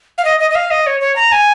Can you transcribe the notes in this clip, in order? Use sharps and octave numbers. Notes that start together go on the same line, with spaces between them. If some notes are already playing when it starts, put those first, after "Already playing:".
F5
D#5
D#5
D#5
F5
D#5
C#5
C#5
A#5
G#5